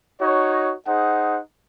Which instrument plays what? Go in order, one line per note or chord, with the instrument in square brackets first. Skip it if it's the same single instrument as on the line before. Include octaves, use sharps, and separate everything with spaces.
[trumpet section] D#4 F#4 C#5
D#4 G#4 C5 F#5